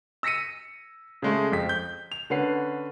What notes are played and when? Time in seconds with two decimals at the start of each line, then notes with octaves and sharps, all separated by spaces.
0.23 E6 A#6 B6 C#7 D#7
1.22 C#3 G#3 A3
1.52 F2 B6
1.69 G6
2.12 F7
2.30 D3 C#4 B4 F#5 C7